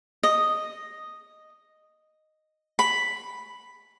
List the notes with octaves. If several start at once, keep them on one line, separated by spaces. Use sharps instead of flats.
D#5
B5